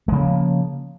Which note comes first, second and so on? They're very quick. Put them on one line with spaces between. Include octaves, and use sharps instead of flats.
G#3 C#3 A#3 F3